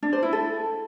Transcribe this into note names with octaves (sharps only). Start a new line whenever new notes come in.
D4
C5
E4
A4